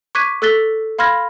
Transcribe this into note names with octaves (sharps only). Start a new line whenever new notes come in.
C#6 D6 F#6 G#6 B6 D#7
A4 E6 F#6 A6 B6 G7
F5 B5 C6 F6 G#6 A#6